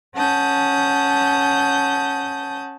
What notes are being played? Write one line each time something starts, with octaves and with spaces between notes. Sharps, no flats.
C#4 F#5 A5 D#6 G6